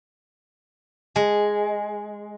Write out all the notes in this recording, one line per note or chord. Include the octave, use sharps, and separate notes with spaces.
G#3